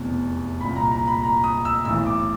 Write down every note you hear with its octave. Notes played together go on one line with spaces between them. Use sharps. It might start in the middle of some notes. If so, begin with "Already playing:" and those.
Already playing: F1 E2 B2
C2 A#2 B5
A#5
A#5
B5
A#5
D#6
E6
B1 A2 E3 E6
D6